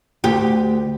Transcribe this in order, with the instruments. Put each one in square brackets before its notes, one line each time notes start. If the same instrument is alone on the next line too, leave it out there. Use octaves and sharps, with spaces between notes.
[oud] D2 G4